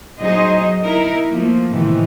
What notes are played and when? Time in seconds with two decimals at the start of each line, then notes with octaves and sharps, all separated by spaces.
0.20 F#3 D#4 G#4 C5 D#5
0.83 D#4 E4 A#4
1.29 F3 A3 A#3
1.71 A2 C3 D#3 E3